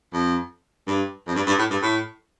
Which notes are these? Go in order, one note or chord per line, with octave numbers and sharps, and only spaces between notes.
F2
G2
F2
G2
G2
A2
G2
A2